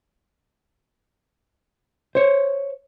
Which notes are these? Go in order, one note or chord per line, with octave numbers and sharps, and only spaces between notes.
C5 C#5